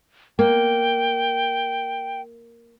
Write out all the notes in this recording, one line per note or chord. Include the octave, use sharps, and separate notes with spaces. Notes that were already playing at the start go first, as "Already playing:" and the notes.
A#3 G5